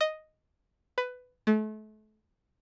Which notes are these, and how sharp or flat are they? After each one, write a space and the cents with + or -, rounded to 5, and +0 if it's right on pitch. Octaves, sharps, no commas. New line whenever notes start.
D#5 +0
B4 +15
A3 -35